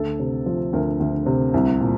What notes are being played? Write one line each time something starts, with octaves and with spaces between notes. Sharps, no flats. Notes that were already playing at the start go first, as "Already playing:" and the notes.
Already playing: D2 A4
C3
F3
D2 A#4
D2
C3
C2
A#2